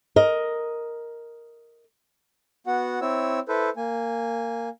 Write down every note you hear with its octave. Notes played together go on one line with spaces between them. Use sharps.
A#4 D#5
B3 F#4 F#5
C4 E4 C#5 E6
E4 A4 B4 C5
A#3 G#5